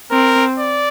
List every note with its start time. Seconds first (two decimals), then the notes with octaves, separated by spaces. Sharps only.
0.11 C4 A#4
0.59 D5